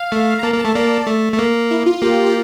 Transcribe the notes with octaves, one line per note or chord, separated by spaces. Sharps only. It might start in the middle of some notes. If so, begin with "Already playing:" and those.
Already playing: F5
A3
A#5
A#3 A5
A#3
A5
A3
A#3 D5
A3
A3
A#3
E4
F4
A#3 G4
G4